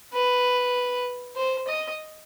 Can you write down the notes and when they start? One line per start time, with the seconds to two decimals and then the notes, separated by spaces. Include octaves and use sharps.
0.13 B4
1.36 C5
1.67 D#5